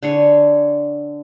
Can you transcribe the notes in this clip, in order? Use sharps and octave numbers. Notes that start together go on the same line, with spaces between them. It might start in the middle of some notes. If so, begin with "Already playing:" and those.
D3 G#4 C#5